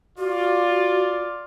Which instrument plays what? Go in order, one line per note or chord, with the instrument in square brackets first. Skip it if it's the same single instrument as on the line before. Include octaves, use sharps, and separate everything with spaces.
[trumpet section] F4 D5 [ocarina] F#4